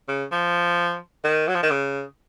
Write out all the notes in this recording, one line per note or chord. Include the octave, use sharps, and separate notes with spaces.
C#3
F3
D#3
F#3
F3
D#3
C#3